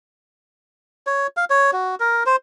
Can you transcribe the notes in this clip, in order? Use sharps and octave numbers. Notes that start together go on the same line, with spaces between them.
C#5
F5
C#5
F#4
A#4
C5